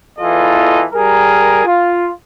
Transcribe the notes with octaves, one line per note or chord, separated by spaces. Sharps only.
E2 E3 F4 A4 D#5
G3 G#4 A#4
F4